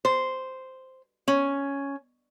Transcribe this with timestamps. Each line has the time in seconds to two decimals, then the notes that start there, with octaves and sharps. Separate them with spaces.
0.05 C5
1.28 C#4